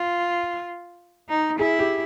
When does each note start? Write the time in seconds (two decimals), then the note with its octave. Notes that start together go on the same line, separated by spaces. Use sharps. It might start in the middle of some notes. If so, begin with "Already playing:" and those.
Already playing: F4
1.29 D#4
1.59 E4 G#4
1.79 G4